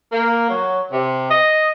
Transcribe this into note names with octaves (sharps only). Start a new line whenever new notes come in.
A#3
F#3
C3
D#5